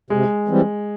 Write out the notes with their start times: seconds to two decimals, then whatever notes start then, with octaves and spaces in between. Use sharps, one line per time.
0.10 C3 G#3
0.48 E3 G3 C4